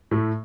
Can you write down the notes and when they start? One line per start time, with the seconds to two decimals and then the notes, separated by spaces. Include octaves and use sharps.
0.11 A2 A3